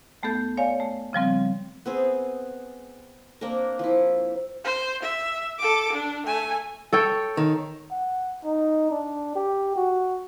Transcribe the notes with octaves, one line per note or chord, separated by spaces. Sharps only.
D#2 A3 B3 A4 G6
C#5 D5 F5 G#5
A3
C#3 F3 G3 C4
B3 C4 G#4
A#3 C4 D4 A#4
F3 E4
C5
E5
A4 D6
D4
A3 G#5
A4 C#5 G5
D#3
F#5
D#4
D4
G4
F#4